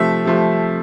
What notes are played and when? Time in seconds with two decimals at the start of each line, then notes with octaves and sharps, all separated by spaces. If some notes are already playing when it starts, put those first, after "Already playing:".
Already playing: C3 F3 A3 E5
0.25 C3 F3 A3